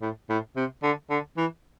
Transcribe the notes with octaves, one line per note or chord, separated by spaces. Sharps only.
A2
A2
C3
D3
D3
E3